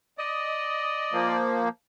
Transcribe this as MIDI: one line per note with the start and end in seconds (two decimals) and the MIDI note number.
0.18 1.37 74
0.18 1.30 75
1.13 1.69 53
1.13 1.69 58